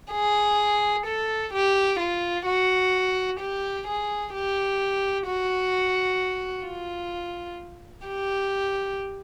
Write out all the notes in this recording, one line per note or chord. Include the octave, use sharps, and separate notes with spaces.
G#4
A4
G4
F4
F#4
G4
G#4
G4
F#4
F4
G4